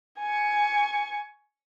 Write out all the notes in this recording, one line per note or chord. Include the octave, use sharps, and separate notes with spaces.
G#5 C#6